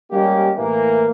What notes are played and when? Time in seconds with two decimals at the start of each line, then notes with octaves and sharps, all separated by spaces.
0.11 G3 G#3 A#3 C#4 G4
0.57 A2 E3 A#3